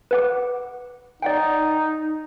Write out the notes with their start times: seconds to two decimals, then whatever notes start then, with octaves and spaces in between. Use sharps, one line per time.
0.11 B4 F#5 D6
1.22 D#4 D5 F#5 G5